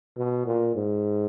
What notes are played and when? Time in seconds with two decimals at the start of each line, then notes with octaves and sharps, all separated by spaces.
0.17 B2
0.46 A#2
0.75 G#2